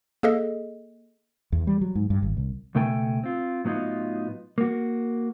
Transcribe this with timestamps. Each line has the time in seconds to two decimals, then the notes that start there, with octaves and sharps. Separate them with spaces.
0.23 A#3 G#4 A4 D#5
1.52 E2
1.67 G3
1.81 F#3
1.95 G#2
2.10 G2
2.22 G#1
2.37 C2
2.75 C#2 B2 A3 A4 G5 G#5
3.24 C4 F4
3.65 A2 F#3 B3 D#4 F4
4.58 A#3 F#4